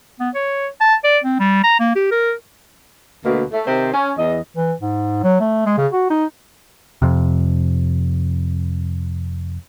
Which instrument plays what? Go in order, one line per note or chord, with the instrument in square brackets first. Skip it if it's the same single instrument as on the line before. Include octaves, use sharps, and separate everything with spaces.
[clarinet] B3
C#5
A5
D5
C4
G3
A#5
A#3
G4
A#4
[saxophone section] D2 B2 A#3
A3
C3 D#3 C5
C#4
E2 D#5
[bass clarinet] E3
G#2
F#3
A3
G#3
C#3
F#4
D#4
[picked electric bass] F2 C3